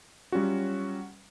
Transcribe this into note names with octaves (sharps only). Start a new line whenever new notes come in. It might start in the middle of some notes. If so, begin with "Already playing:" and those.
F#3 G3 C#4 F4 F#4